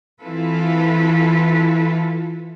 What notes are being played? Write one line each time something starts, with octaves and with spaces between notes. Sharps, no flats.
E3 C4 E4 F4 A4 B4